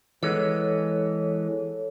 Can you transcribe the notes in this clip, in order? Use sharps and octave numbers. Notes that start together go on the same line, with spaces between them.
E3 G#3 B3 A4 C#5